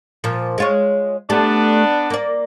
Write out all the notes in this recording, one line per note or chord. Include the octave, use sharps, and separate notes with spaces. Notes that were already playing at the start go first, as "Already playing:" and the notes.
A#2 F3
G#3 F4 C#5
A3 B3 D4 G4
A#3 D5